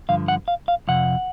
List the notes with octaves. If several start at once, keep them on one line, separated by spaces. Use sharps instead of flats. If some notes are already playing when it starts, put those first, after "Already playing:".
G2 D3 F3 F5
F#5
F5
F5
F2 C3 F#5